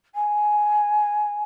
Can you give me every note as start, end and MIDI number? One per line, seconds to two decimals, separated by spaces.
0.15 1.44 80